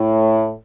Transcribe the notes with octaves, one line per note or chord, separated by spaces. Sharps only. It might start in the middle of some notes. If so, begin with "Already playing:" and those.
Already playing: A2